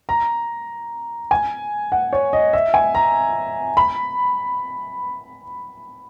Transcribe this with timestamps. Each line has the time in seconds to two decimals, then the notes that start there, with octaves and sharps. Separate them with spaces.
0.09 A#5
1.31 G#5
1.92 F#5
2.13 C#5
2.33 D#5
2.53 E5
2.74 G#5
2.95 A#5
3.77 B5